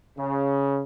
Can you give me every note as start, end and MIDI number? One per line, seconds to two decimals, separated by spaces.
0.18 0.84 49